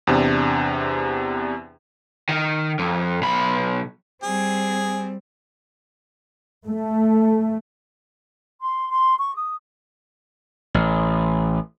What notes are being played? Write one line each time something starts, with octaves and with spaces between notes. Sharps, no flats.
E2 C3 D4
D#3
F2
B1 B5
G3 C4 G#4
A3
C6
C6
C#6
D#6
A1